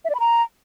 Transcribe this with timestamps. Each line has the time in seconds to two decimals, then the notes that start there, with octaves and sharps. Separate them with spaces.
0.05 E5
0.10 D5
0.15 B5
0.20 A#5